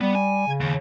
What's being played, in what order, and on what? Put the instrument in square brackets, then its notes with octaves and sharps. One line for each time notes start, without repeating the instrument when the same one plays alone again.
[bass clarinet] G3 [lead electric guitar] B3
[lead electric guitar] G#5
[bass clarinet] C#3
[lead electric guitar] D#2